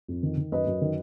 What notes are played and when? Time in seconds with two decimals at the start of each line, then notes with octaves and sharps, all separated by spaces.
0.08 F2
0.23 D#3
0.37 D#3
0.52 F#2 B4 D#5
0.67 F#2
0.81 D#3